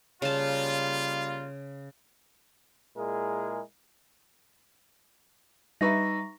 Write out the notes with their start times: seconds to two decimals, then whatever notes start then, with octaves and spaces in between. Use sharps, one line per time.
0.22 C#3 G3 A#3 F4 A5
2.96 A#2 G#3 E4 G#4 A#4
5.81 G3 D#4 B4 E5 A#5 C#6 A#6